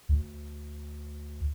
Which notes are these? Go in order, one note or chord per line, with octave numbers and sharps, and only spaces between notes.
D2